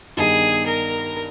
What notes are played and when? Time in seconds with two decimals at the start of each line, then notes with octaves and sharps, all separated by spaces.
0.17 G2 D#3 G3 B3 D#4 G#4
0.66 A#4